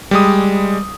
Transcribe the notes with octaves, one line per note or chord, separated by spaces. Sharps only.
G3 G#3 D#6